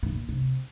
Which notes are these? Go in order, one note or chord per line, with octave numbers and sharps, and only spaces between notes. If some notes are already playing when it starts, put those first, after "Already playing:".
C3
A#2
C3